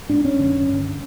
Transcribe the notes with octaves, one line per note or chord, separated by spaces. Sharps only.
G#2 D4
C#4
F#2 D3
G2 D3